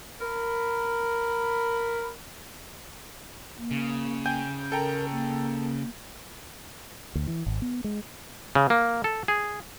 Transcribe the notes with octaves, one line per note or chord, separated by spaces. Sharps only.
A#4 B5
A#3
C#3
G5 G#5 G6
A4 A#4 G5 A#5
A#3
D2
E3
G#1
B3
G#3
C#3
A#3
A4
G#4